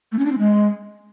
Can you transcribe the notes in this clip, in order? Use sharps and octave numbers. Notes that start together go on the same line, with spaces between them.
A3
C#4
D4
C4
G#3